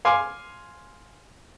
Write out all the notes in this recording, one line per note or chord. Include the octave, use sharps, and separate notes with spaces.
F5 G#5 C6 D6